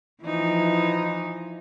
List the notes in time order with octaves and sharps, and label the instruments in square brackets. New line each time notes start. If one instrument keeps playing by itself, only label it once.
[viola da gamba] E3 F3 D#4